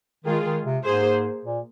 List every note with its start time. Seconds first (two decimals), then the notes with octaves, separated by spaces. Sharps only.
0.24 D#3 G#3 F4 G#4
0.45 D#3
0.65 C3
0.84 G#2 A#3 G#4 C5
1.45 A#2